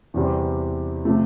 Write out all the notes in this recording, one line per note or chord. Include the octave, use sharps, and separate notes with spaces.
E2 C3 G3 C4 G4
C3 F3 A3